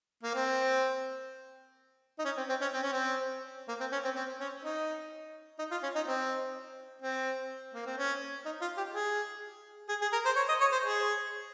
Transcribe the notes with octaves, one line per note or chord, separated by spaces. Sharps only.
A#3
C4
D#4
C#4
C4
C4
C#4
C4
C#4
C4
A#3
C4
C#4
C4
C4
C#4
D#4
D#4
F4
C#4
D#4
C4
C4
A#3
C4
C#4
D#4
F4
G4
G#4
G#4
G#4
A#4
C5
C#5
D#5
C#5
C5
G#4